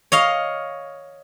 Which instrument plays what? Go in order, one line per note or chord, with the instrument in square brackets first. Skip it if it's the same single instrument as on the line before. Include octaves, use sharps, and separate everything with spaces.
[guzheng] C#5 D#5 F5